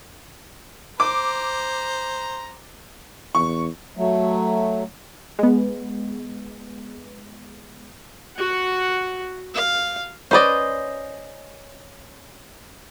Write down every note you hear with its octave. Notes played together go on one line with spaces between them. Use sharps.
C5 A#5 D6
E2 C#6
F#3 A3
G#3 B3
F#4 F#5
F5
C#4 B4 C5 D5 D#5